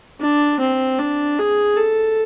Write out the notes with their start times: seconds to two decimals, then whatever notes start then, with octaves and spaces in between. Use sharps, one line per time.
0.20 D4
0.60 C4
0.99 D4
1.39 G#4
1.77 A4